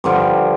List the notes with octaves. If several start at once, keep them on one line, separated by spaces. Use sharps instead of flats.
G2 D3 F3